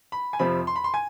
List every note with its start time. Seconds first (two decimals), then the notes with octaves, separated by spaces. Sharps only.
0.12 B5
0.33 G#5
0.39 F2 C3 F3 C4 B5
0.67 C6
0.76 B5
0.84 C6
0.94 G#5